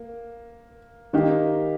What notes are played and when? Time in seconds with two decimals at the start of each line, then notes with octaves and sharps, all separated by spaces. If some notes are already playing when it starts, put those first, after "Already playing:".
Already playing: A#3
1.13 D#3 A#3 D#4 G4